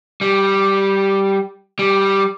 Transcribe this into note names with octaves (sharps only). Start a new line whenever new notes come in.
G3
G3